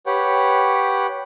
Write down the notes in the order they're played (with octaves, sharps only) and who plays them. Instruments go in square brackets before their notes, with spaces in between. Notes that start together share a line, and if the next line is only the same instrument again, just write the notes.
[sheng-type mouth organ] G4 B4 C#5 F#5 G5